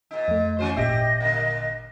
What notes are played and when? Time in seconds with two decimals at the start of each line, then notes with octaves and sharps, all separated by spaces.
0.11 A#2 D#4
0.28 F2 A3
0.59 E3 C#4 F#4 C5
0.77 G#1 A#2 G4 D#5 E5
1.20 D3 A#3